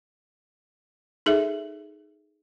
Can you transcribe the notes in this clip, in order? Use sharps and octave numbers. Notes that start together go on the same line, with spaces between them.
D#4 G#4 A4 E5